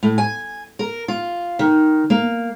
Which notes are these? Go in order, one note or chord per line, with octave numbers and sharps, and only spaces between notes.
A2
G#5
A#4
F4
D#3
A#3